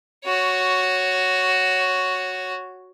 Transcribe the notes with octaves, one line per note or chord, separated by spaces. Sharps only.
F#4 C#5